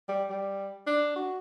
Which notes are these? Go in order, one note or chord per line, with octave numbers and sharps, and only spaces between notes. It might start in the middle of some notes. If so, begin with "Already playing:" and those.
G3
G3
D4
F#4